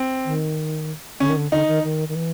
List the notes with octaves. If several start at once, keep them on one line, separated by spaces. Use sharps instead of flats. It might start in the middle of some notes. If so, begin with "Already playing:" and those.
Already playing: C4
D#3
D3 C#4
D#3
D3
D3 D#4
D#3
D#3
D#3
E3